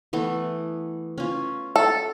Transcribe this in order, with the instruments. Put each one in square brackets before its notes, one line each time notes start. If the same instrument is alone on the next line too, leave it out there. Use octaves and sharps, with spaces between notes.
[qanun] E3 A3 B3
C#4 F4
[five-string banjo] A4